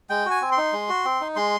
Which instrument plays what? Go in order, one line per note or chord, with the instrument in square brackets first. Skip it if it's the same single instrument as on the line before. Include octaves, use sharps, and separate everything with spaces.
[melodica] G#3 G5
F#4 G#5
C4
C6
D#4
G#3
F#4
C4
D#4
G#3 C6